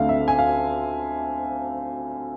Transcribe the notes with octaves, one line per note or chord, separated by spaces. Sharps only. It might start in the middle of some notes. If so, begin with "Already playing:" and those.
Already playing: D2 D3 A3 C4 F5
E5
G#5
F5